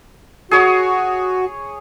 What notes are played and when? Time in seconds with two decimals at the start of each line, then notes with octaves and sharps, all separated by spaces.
0.51 F#4 G#4 C#5 D#6